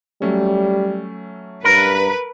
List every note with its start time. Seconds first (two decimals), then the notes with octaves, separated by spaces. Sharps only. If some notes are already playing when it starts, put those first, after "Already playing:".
0.22 F#3 G3 A3 C#4
1.64 G2 A#4 B4